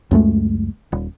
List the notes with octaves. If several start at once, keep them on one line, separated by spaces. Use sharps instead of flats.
C#2 F#2 G#3 A3
D#1